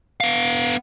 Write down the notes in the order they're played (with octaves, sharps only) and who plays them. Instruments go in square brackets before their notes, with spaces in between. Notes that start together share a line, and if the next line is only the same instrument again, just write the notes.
[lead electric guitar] B3 F5